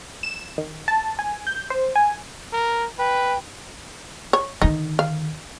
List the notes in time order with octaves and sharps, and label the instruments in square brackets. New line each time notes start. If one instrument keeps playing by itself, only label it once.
[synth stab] E7
D#3
A5
G#5
G6
C5
G#5
[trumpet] A#4
[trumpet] B4 [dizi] G5
[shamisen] C#5
[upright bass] D3 D#3 [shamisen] D#4
[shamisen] F5